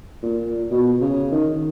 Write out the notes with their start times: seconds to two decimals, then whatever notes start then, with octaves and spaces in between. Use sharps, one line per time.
0.23 A#2
0.70 B2
1.01 C#3
1.32 D#3